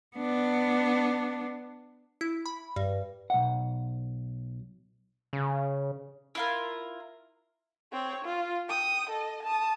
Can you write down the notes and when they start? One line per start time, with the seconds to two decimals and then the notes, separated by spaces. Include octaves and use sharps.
0.17 B3 D4
2.21 E4
2.46 B5
2.76 G2
3.30 B1 F#5
5.33 C#3
6.35 E4 F4 A#4
7.92 C4 C#5
8.25 F4
8.69 G5 D#6
9.10 A4 D#5
9.43 A5 D#6